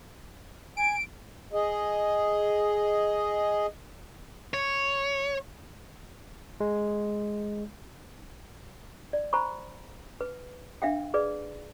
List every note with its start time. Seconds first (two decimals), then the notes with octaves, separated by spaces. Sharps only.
0.77 G#5 D7
1.53 G#4 D#5
4.54 C#5
6.60 G#3
9.13 D5
9.33 C5 G#5 A#5 B5 C#6
10.21 B4
10.82 D4 E5 F5 G5
11.14 G#4 B4 D5